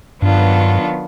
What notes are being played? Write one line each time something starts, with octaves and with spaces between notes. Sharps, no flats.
G2 D#3 F#3 B3 D4 F4